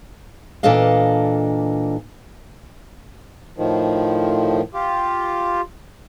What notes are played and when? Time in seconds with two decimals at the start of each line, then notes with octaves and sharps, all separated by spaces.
0.63 A#2 E3 D4 A4 D#5 F5
3.57 A2 D#3 F3
4.74 F4 G4